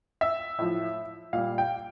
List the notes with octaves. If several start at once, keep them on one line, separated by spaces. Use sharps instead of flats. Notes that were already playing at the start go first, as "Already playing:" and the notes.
E5
A2 F3
A#2 G3 F5
G5